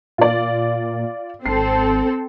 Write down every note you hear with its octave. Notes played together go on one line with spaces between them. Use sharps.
A#2 F4 D5
G#1 C4 A4 C7